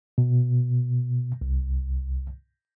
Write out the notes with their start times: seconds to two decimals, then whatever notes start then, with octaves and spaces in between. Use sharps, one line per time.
0.18 B2
1.41 C2